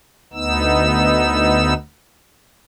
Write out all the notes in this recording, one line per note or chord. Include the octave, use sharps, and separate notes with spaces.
D2 B3 D#4 E6